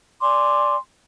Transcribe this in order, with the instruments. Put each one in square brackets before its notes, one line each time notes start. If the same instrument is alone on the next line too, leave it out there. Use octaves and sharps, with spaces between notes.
[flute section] D5 G#5 C6 D6